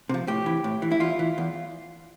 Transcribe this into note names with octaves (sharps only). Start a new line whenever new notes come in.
C3 F3
A2 G4
E3
A2
E3
E4
E2 F4
E3
E2